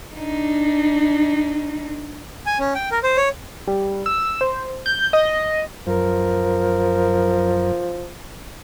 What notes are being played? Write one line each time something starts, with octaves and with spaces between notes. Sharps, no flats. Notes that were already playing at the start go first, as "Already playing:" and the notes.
D4 D#4
G#5
C#4
G5
A#4
C5
C#5
G3
E6
C5
G6
D#5
F#2 F3 A#4